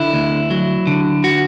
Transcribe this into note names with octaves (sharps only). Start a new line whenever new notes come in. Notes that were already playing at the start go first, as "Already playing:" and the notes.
Already playing: D3 E4
D2
F#3
D3
F#4